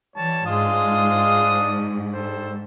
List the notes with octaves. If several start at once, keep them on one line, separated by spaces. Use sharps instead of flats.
E3 G3 C#5 A5
G#2 G#3 D4 F4 D#6
G3 A4 C5